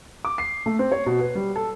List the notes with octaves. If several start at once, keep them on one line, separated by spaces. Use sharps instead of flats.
D6
C7
A3
C4
C#5
B2
B4
G3
A4